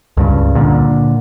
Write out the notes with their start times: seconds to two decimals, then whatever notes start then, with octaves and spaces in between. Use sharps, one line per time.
0.17 C#2 G2 C#3
0.55 A#2 D3